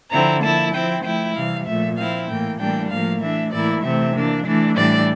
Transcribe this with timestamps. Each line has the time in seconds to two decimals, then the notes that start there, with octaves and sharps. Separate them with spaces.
0.12 D3 F3 C4 E4 A#5
0.42 F3 A#3 E4 A5
0.74 F3 C4 E4 G5
1.04 F3 A3 E4 G5
1.35 C3 E3 G3 F5
1.67 A#2 F3 A3 E5
1.97 F3 C4 E4 F5
2.28 A2 E3 A#3 G5
2.59 A2 E3 G3 A#3 D4 G5
2.91 A2 F3 A#3 F5
3.21 E3 A3 D4 E5
3.52 A2 E3 A#3 E4 D5
3.83 C3 E3 A3 C4 E5
4.15 E3 A#3 D4
4.45 E3 A3 D4
4.76 A2 E3 G3 D4 D5